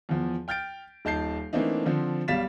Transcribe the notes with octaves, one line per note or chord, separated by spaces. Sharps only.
E2 F3
G5 F6 G6 A6 D7
D#1 D#4 A5 G6 C7
E3 A3 A#3 C4 D4 D#4
D3 F3 C4
B1 G3 F5 A6 B6 E7